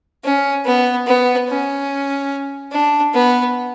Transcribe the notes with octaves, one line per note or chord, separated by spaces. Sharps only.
C#4
B3
B3
C#4
D4
B3